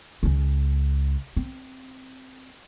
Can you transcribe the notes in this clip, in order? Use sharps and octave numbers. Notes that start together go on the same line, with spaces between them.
C#2 C#4
C4